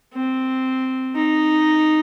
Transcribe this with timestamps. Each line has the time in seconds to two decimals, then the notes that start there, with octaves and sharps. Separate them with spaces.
0.14 C4
1.15 D#4